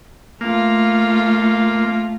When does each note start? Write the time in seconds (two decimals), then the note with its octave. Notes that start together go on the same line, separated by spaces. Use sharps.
0.41 A3 A#3 F4